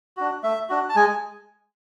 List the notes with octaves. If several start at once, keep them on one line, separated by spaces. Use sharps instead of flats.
D4 F#4
A3 E5
D4 F#4
A5
G#3 G#5